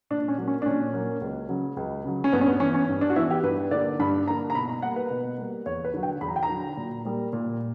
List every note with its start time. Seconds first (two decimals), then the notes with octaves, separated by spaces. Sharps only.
0.10 A#2 D4
0.28 C#4
0.38 F#3 A#3
0.48 C#4
0.62 D4
0.66 A#2 C#4
0.93 F#3 A#3
1.21 C#2
1.49 C#3 F#3
1.77 C#2
2.05 C#3 F#3
2.24 C#4
2.33 G2 B3
2.41 C#4
2.47 B3
2.60 E3 B3 C#4
2.74 C#4
2.89 G2
3.01 D4
3.10 F#4
3.16 E3 B3 E4
3.30 G4
3.43 G2 B4
3.71 D3 A#3 D5
3.99 G2 B5
4.27 D3 A#3 A#5
4.50 A#5
4.55 B2 B5
4.69 A#5
4.82 G3 A#3 F#5
4.96 B4
5.10 B2
5.38 G3 A#3
5.66 E2 C#5
5.84 B4
5.94 D3 F#3
6.03 G5
6.21 E2 B5
6.28 A#5
6.36 G5
6.43 A#5
6.49 D3 F#3
6.77 A#2
7.05 G3 A#3
7.33 A#2